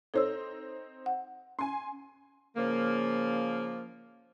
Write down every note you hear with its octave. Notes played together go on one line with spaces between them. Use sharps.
C4 D#4 A4 C5 C#5 E6
F#5
C#4 G#5 C6
C#3 F3 A#3